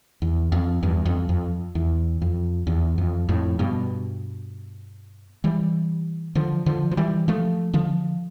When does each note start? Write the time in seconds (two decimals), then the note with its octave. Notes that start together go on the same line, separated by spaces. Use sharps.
0.22 E2
0.52 F2
0.83 E2 G2
1.06 F2
1.29 F2
1.75 E2
2.22 F2
2.67 E2
2.98 F2
3.29 F2 A2
3.59 G2 B2
5.44 E3 G3
6.35 D3 F3
6.66 D3 F3
6.91 F3
6.97 E3 G3
7.28 F3 A3
7.74 D3 F3